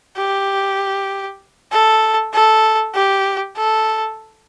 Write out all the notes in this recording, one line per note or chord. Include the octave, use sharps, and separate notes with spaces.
G4
A4
A4
G4
A4